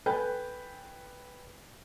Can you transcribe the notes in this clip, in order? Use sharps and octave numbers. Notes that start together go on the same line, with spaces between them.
A4 B4 G5 G#5 G6